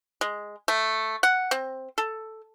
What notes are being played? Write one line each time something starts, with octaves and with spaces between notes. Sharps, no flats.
G#3
A3
F#5
C4
A4